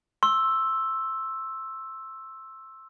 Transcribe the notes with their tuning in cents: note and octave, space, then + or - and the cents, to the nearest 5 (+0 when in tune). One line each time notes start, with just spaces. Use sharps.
C6 +30 E6 +0